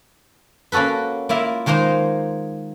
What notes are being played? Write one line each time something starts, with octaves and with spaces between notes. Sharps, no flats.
A#3 C#4 F#4 A4 B4
A#3 E4 F4 E5
D#3 G#3 A#3 D#4 C5